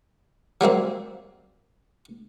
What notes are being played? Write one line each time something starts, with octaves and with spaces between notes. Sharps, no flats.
F#3 G3 A#3 C4